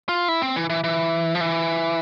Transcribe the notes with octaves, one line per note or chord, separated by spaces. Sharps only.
F4
E4
C4
E3
E3
E3
F3
E3